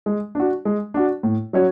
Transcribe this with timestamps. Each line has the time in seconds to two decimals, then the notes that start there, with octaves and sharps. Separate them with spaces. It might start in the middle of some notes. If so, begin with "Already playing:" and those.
0.06 G#3
0.35 D4 F#4
0.65 G#3
0.94 D4 F#4
1.23 A2
1.53 F#3 C#4 F#4 C#5